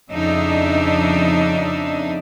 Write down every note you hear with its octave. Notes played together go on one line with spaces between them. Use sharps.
F2 C#3 D4 D#4 E5